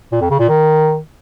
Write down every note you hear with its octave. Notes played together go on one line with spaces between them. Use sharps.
A#2
F2
C#3
A#2
D#3